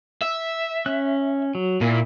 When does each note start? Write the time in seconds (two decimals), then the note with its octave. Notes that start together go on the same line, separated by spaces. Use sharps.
0.22 E5
0.86 C#4 F#6
1.55 F#3
1.81 A#2 E4